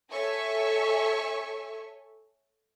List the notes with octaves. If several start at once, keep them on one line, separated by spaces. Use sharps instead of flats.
A4 C#5 E5 G#5 C#6